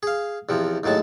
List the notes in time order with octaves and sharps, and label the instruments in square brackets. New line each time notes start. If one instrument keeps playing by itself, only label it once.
[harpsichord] G#4 F5
E2 C3 F3
D#2 A2 F#3 G#3 A5